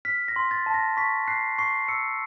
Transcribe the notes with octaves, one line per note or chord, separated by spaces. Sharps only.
F6 B6
A#6
C6
A6
A5
A#6
C#6 B6
F#6 C7
C#6 C7
E6 C#7